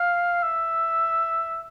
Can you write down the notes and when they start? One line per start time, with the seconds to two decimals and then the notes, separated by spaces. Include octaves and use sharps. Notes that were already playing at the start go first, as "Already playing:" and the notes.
Already playing: F5
0.43 E5